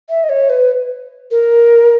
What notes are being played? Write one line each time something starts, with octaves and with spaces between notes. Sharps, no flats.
E5
D#5
C#5
B4
A#4